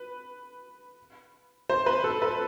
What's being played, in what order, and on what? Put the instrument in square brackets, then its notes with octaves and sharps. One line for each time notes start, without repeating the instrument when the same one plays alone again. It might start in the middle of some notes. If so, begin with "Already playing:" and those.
Already playing: [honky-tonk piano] B4
C5
B4
A4
B4